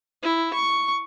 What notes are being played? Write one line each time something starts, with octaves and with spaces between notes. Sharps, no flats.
E4
C#6